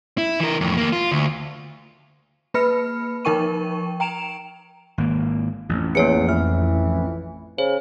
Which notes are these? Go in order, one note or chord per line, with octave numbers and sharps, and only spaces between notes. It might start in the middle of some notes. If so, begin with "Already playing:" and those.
E4
E3 A#4
F2 A2
D#2 A#3
F4
D2
A#3 B4 B5 F6 C#7
F3 D#4 A#4 G5 C#6 D#7
G5 A#5 D7 E7 F7
G#1 A#3
A1 F2
E2 A#3 C#5 C#7
E3 F6
C#3 C5